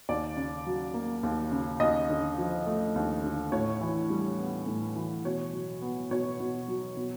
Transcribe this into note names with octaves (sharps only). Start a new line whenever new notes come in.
D#2 D5
C#3
F#3
A#3
D#2
C#3
D#2 D#5
D3
F3
A3
D#2
D3
A2 C#5
E3
G3
B3
A2
E3
B2 C#5
F#3
B3
B2 C#5
B2
F#3
B2